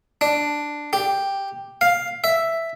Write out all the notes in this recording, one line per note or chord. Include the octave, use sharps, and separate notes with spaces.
D4
G4
F5
E5